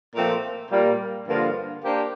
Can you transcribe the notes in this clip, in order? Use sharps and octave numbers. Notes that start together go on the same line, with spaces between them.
A#2 F3 A3 C4
A#2 G3 A#3
G2 D3 F3 A#3 F4
A#3 D4 G4 C5